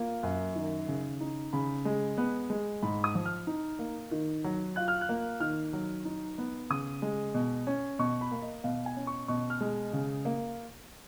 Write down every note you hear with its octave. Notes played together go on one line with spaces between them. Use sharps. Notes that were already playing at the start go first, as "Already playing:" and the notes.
Already playing: A#3 F4
F#2
D#3
C#3
D#4
C#3 B5
G#3
B3
G#3
G#2 B5
D#6
F3
F6
D#4
A#3
D#3
F#3
F4 F#6
F6
F#6
A#3
D#3 F6
F#3
D#4
B3
C#3 D#6
G#3
B2
C#4
B2 C#6
B5
A#3
D#5
B2 F5
G#5
C#4
C#6
B2 C#6
F6
G#3
C#3
A#3